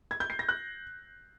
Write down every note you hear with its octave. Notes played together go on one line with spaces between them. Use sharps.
G#6
G6
C7
A#6
F#6